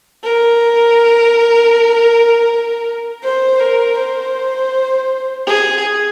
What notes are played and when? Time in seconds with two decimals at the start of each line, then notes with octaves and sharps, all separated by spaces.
0.24 A#4
3.23 C5
3.60 A#4
3.97 C5
5.47 G#4